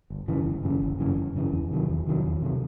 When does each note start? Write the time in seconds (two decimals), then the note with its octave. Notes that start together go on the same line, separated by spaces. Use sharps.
0.10 G1
0.28 F#2 C#3 E3
0.46 G1
0.64 F#2 C#3 E3
0.82 G1
1.00 F#2 C#3 E3
1.17 G1
1.35 F#2 C#3 E3
1.52 E2
1.71 C3 D#3 F#3
1.89 E2
2.07 C3 D#3 F#3
2.24 E2
2.42 C3 D#3 F#3